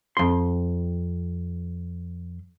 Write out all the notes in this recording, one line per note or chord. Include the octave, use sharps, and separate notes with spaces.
F2 C6